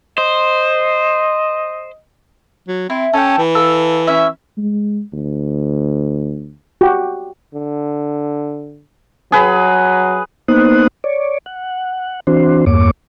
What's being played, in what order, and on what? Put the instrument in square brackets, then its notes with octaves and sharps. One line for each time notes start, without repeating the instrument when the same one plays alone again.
[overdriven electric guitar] C5 [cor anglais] D#5
[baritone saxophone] F#3
[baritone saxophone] C4 [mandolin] E4
[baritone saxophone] C#4 [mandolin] A4 G5
[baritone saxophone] E3
[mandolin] A4 F5 E6
C#4 E4 E5
[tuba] G#3
D2
[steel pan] F#4 G4
[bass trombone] D3
[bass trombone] F#3 [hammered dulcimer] G#4 B4
[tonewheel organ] A#3 B3 D#4 C5 D#6 F#6
C#5 D5
F#5
E3 C4 D4 F#4 C5
E2 G2 A#3 C#5 D6